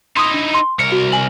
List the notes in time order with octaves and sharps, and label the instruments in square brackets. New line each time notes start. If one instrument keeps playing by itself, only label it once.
[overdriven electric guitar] D#4 E4 [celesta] C6 D#6
[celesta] D4
C6
[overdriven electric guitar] C2 A#4 [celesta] C#7
[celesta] F#4
G#5 F#7